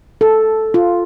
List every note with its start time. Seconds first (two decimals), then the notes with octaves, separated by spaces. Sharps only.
0.21 A4
0.74 F4